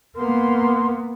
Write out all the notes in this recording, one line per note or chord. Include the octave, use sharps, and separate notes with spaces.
A#3 B3 C6